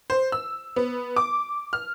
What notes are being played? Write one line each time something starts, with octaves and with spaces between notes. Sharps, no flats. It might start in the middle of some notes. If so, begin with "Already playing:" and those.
C5
E6
B3
D6
F6